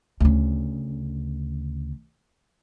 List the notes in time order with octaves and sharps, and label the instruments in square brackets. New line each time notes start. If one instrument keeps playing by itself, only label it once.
[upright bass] D2 C#3